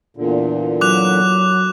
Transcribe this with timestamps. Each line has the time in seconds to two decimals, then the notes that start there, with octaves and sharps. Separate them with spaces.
0.17 E2 A#2 D3
0.81 F#3 D6 F#6 F7